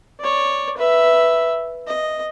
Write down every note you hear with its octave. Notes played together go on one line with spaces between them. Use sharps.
C#5 D5
B4 E5
D#5